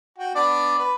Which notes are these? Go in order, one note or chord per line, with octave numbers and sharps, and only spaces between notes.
F#4 G5
B3 D4 D5
B4